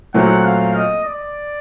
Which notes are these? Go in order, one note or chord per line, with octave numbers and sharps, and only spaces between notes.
A#2 F#3 A3 C4 F#5
F5
D#5
D5